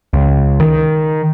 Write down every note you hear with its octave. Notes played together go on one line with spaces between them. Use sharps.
C#2
D#3